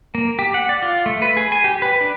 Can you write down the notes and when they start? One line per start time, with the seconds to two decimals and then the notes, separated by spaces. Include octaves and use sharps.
0.15 A#3
0.39 G4
0.54 F#5
0.69 D5
0.82 F4
1.06 A3
1.22 B4
1.37 G#4
1.52 G#5
1.64 G4
1.82 B4
2.01 D4